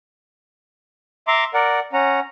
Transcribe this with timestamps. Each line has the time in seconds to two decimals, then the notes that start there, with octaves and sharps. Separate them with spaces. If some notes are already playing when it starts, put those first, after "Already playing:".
1.28 E5 A#5 C6 D6
1.54 A#4 D5 F#5
1.93 C#4 F#5 A#5